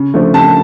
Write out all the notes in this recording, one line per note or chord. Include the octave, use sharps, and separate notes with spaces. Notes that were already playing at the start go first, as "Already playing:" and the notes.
Already playing: C#3
F3 A3 D4
C#3 A5